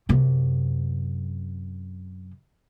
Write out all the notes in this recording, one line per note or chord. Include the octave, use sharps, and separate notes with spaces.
F#2 C3